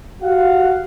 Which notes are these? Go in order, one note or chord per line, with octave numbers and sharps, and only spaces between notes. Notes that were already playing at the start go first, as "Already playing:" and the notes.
F#4 G4 F5 F#5